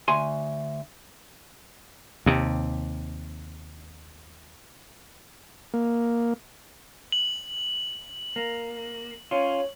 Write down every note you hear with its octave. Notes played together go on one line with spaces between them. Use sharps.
D2 G#5 C6
D#2 C3
A#3
F#7
A#3
C#4 F4 C#5